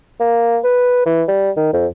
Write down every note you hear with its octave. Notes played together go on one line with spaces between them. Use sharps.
A#3
B4
E3
G3
D#3
F2